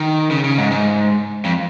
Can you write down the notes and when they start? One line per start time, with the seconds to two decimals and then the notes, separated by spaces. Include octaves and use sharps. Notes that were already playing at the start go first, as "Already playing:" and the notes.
Already playing: D#3
0.30 C#3
0.44 C#3
0.58 G#2
0.71 G#2
1.45 F2